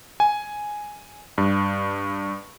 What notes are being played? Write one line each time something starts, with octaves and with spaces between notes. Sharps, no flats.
G#5
G2